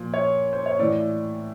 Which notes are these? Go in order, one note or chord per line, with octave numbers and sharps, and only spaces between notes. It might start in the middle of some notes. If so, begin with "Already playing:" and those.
Already playing: A#2 F3
C#5
C5
C#5
A2 E3 D5